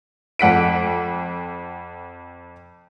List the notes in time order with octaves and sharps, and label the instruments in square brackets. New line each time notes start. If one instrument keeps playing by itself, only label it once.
[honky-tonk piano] F2 F#5 B6 D7